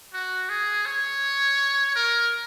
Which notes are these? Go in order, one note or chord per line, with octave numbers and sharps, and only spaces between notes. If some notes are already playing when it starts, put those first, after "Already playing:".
F#4
G#4
C#5
A#4